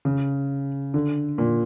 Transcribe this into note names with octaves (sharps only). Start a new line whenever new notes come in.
C#3
D3
A#2